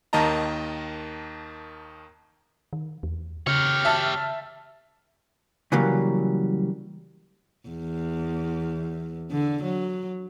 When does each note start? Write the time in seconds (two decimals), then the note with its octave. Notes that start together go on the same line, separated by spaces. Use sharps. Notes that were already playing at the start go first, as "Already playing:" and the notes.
0.13 D#2 D#3 A#3 D#5 A5 A#5
2.73 D#3
3.03 E2
3.47 C#3 G4 C#5 F6
3.85 E5 A5
5.72 C#3 E3 F#3 G3 A#3
7.68 E2
9.31 D3
9.63 F#3